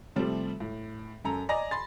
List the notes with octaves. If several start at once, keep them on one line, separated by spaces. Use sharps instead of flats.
C3 F3 G3 A3 C4
A2
F#2 A4 A#5
D5 D#5 G#5 A#5 A#6
B5 C6 A6